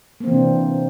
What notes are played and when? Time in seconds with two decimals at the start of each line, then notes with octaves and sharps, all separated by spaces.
0.20 A#3
0.24 C4
0.27 E3
0.30 C3
0.34 D4